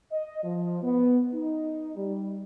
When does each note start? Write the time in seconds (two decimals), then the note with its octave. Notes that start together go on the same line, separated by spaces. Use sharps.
0.11 D#5
0.43 F3
0.83 B3
1.34 D#4
1.96 G3